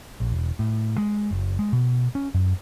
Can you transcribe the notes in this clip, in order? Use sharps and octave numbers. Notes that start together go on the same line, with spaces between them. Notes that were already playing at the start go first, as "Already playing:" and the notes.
A#1
E1
A2
G#3
F#1
G#3
B2
C#4
F#2